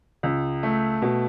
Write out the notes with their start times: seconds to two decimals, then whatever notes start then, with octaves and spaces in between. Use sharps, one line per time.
0.23 C#2
0.63 A3
1.02 B2